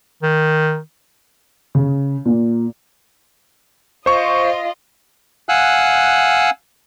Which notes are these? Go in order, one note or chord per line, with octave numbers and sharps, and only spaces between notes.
D#3
C#3
A#2
F4 C5 D#5 C#6
F5 F#5 G#5 E6 F#6